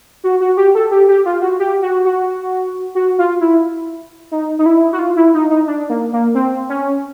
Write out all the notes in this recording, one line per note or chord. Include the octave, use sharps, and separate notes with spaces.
F#4
F#4
G4
A4
G4
G4
F4
F#4
G4
F#4
F#4
F#4
F4
E4
D#4
D#4
E4
F#4
F4
E4
D#4
D#4
D4
A#3
A#3
C4
C#4